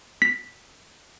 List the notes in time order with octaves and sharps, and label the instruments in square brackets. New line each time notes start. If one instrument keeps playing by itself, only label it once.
[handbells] B6